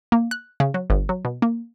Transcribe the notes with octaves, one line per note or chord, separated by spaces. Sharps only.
A#3
F#6
C#3
F#3
G1
F#3
B2
A#3